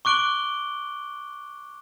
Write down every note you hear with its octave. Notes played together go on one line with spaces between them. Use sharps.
C#6 D6 F#6 D7 F#7 G7